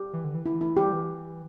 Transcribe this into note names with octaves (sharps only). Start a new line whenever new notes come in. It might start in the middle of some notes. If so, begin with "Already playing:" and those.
Already playing: G4
E3
D3
E3
E4
E4
G3 G4
E3